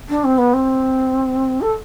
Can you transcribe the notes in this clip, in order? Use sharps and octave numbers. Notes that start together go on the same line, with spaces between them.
D4
C4
B3
C4
A4